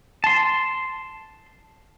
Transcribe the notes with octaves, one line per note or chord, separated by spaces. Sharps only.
A5 C6